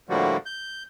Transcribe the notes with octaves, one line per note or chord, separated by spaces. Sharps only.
A2 D3 F3 G3 A#3 F#4
G6